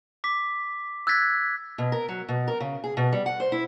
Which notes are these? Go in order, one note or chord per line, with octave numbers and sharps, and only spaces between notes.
D6 B6
E6 F#6 G#6 A6 B6
B2
A#4
F#3
B2
A#4
C#3
G#4
B2
G3
F#5
C5
E4